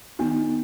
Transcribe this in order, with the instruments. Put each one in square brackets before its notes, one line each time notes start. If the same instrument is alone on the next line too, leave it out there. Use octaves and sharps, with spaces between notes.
[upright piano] D#3 [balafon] B3